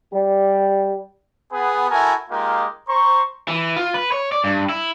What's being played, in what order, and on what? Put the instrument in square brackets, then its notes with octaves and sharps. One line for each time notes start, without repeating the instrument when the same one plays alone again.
[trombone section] G3
[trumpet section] B3 G#4 B4
E4 F#4 A4 A#4 G#5
G#3 A#3 D#4 F4 G4 A#4
C5 A#5 C#6
[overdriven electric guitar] E3
F4
B4
C#5
D5
G2
E4